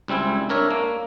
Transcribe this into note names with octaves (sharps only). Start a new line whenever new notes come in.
C#2 G3 C4 E4 G#5
D4 A#4 C#5 E5
A#3